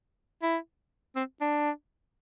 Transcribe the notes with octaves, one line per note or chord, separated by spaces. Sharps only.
E4
C4
D4